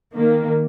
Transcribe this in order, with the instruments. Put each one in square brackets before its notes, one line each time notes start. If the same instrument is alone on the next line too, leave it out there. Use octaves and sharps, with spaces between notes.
[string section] D#3 A#3